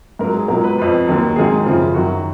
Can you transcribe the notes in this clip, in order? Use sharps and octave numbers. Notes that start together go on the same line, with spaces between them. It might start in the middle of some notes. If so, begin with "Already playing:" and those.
G#2 A#4
F#3
G#4
C#2 B2 F#3 A#4
B4
F2 F3 B4
D#2 D#3 F#3
G#2 D#3 F#3 G#4
F#2 C#3 F3
F#2 D#3 F#3 F#4